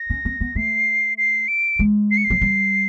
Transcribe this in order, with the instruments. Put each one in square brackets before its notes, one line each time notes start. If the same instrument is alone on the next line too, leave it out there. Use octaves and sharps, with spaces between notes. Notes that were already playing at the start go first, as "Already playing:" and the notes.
Already playing: [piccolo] A#6
[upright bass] C#4
C4
B3
[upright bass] A3 [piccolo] C7
[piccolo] C7
D7
[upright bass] G#3
[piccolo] C7
C#7
C7
[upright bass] F#3
G3